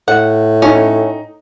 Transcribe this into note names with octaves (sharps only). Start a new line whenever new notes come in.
A2 F#5
C#4 D#4